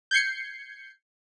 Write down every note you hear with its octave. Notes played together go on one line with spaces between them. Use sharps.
G6 G#6 C7 C#7